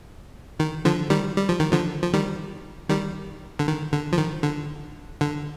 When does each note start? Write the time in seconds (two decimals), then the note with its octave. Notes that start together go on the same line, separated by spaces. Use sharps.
0.60 D#3
0.85 D3 F3
1.10 D#3 G3
1.37 G3
1.49 F3
1.60 D#3
1.73 D3 F3
2.02 F3
2.13 D#3 G3
2.89 D#3 G3
3.59 D3
3.67 D#3
3.93 D3
4.13 F3
4.18 D#3
4.43 D3
5.21 D3